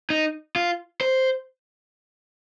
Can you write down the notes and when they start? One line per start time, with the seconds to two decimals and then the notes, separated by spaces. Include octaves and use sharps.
0.10 D#4
0.56 F4
1.01 C5